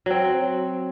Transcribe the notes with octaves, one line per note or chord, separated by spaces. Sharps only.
F#3 C4